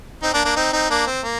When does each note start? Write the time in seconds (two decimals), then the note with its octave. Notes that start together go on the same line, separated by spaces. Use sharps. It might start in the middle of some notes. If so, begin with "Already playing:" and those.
0.22 C4 D#4
0.34 A#3 D4
0.45 A#3 D4
0.56 C4 D#4
0.73 C4 D#4
0.90 A#3 D4
1.06 C4
1.23 A#3